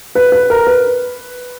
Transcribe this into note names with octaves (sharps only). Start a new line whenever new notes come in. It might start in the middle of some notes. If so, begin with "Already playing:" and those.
B4
B4
A#4
B4